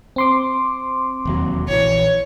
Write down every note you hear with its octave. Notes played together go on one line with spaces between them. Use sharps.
C4 C6 D6
E1 D#2 F#3
A#1 D#3 E3 C#5